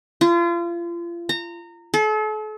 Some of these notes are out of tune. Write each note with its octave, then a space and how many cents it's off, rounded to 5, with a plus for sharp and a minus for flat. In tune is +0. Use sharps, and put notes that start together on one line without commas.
F4 -35
A#5 -25
A4 -40